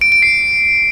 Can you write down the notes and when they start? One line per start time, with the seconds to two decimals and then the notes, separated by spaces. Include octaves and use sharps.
0.01 D7
0.12 D7
0.22 C7